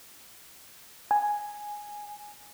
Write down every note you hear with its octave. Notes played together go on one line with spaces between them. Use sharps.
G#5